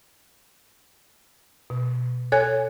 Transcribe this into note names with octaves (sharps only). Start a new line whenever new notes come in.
B2
A4 C#5 G#5 F#6 G#6